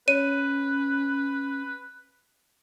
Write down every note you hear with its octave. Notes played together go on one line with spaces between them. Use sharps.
C#4 B4 C#5 D#7